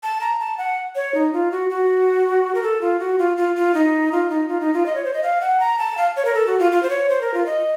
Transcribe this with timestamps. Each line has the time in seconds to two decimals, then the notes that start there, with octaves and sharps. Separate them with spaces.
0.03 A5
0.21 A#5
0.39 A5
0.58 F#5
0.95 C#5
1.14 D#4
1.33 F4
1.52 F#4
1.70 F#4
2.55 A#4
2.63 A4
2.81 F4
3.00 F#4
3.19 F4
3.37 F4
3.56 F4
3.74 D#4
4.12 F4
4.30 D#4
4.49 F4
4.61 D#4
4.74 F4
4.86 D#5
4.95 C#5
5.05 C5
5.13 D#5
5.23 F5
5.41 F#5
5.60 A#5
5.79 A5
5.97 F5
6.16 C#5
6.25 A#4
6.34 A4
6.47 F#4
6.59 F4
6.72 F4
6.83 C5
6.90 C#5
7.09 C5
7.21 A#4
7.34 F4
7.46 D#5